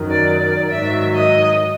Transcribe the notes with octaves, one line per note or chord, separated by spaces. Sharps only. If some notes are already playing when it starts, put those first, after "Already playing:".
Already playing: F#2 D#3 F#3
D5
D5
G#2 D#3 F#3 E5
D#5